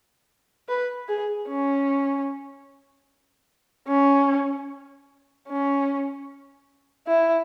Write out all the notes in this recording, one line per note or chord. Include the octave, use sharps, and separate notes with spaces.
B4
G#4
C#4
C#4
C#4
E4